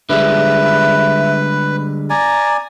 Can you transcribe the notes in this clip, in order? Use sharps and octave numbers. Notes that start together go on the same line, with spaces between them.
D3 G3 G#3 B4 E5
D5 G#5 A#5